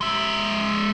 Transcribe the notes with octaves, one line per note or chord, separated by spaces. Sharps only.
G#3 E5